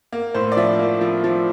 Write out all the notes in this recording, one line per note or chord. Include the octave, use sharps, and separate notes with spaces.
A#3
A2 C5
D5
F3 E5
A#3
F3
F3